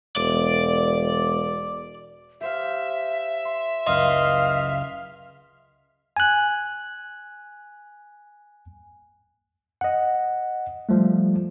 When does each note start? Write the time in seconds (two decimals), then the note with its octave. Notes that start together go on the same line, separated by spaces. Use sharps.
0.16 E1 D5
2.41 G4 C5 E5 F5
3.45 C6
3.86 F#1 C#2 D#5 F5 C6 D#6
6.17 G#5 F#6
9.81 D#5 F#5
10.89 F3 G3 A3